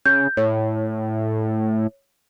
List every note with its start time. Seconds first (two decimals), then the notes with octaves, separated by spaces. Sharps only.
0.06 C#3 G6
0.37 A2 C#5